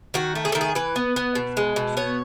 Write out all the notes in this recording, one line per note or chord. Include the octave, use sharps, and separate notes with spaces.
D#3 F#4
A3
G#4
A4
D#3
G#4
E3 B4
B3
B3
B2
G#3
B2
B3 C#5